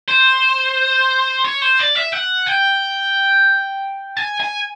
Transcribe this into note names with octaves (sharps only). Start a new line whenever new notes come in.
C5
C#5
C5
D5
E5
F#5
G5
G#5
G#5